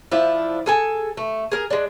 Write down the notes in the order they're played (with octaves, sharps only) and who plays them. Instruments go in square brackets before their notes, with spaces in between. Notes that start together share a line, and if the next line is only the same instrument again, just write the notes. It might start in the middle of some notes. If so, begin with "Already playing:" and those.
[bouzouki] F3 D4 E4
G#4 A4 G#5
A3
G#4 A#4
G#3 D4